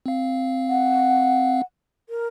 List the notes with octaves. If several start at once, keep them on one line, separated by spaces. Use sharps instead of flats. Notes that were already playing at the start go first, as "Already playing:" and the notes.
C4 F5
F#5
A#4